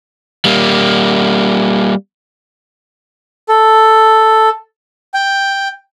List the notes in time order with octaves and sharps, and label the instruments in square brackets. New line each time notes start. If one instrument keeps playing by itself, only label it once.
[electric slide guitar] G3 A#3
[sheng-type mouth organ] A4
G5